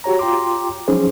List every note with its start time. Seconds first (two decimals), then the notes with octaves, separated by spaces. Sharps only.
0.04 F#4 G4 C#5 A#5
0.19 F4 G5 A#5 C6 D6
0.88 F3 F#3 C#4 D#4 G#4 C5